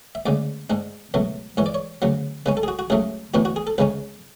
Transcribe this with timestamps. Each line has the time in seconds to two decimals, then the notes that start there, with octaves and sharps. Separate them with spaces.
0.15 E5
0.26 D2 C#3 G#3 D5
0.70 G#2 G#3 D4
1.14 C#2 B2 F#3 A3
1.57 G#2 E3 G#3 C#5
1.66 D5
1.74 C#5
2.02 D2 C#3 F#3
2.46 C#3 G#3 C#4 B4
2.57 A4
2.63 G#4
2.68 F#4
2.79 F#4
2.90 C#2 C#3 F#3 A3 G#4
3.34 A2 E3 B3 D4 F#4
3.45 F#4
3.56 G#4
3.67 A4
3.78 C#2 C#3 G#3 C#4 B4